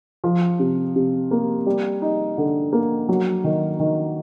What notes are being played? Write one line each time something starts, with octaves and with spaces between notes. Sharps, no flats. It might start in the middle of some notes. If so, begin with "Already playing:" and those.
F3
C3
C3
A#3
G3
D#4
D3
A#3
F#3
D#3
D#3